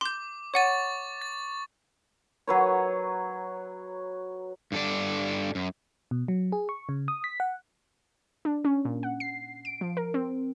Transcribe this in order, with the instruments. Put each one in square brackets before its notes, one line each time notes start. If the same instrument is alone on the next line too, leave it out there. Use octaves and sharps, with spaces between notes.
[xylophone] C6 G6 [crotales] D6
[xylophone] C#5 F#5 D#7 [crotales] C#6 A6
[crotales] A6
[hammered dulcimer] F#3 B4 C#5
[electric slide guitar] G2 A4 D5
F#2
[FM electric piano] B2
F#3
G#4
C#6
C#3
D#6
B6
F#5
[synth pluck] D4
C#4
A#2
F#5
C7
D7
F3
A#4
C4